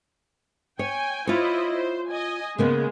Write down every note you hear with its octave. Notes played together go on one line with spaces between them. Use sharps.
C#5 G5 G#5
E4 F4 C5 C#5 D#5
C5
D#5 G#5
C#3 G#3 A#3 B3